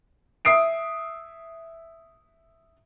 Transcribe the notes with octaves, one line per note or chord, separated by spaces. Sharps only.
E5 D#6 C7 D7